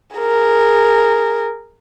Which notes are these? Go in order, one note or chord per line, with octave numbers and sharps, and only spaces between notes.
G#4 A#4